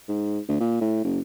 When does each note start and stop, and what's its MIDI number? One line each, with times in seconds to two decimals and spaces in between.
0.09 0.40 44
0.49 0.58 38
0.60 0.80 46
0.81 1.00 45
1.04 1.20 30